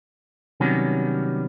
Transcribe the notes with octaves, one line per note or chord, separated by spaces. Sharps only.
C3 D#3 F#3 G3 B3 C#4